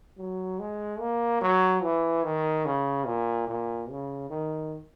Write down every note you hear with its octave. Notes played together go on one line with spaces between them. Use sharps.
F#3
G#3
A#3
F#3
E3
D#3
C#3
A#2
A#2
C#3
D#3